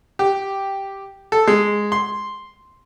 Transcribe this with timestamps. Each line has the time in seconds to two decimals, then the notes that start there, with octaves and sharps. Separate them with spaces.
0.19 G4
1.32 A4
1.48 G#3
1.92 C6